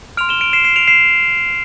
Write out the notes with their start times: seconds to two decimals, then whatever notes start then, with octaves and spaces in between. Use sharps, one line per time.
0.17 C6 F6 D7 F7
0.29 E7 G7
0.41 D7 F7
0.53 C7 E7
0.64 C7 E7
0.76 D7 F7
0.87 C7 E7